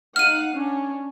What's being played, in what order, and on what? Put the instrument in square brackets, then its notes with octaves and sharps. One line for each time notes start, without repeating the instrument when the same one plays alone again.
[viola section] D#4 F5 F#5 [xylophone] F6 D#7
[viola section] C#4 D4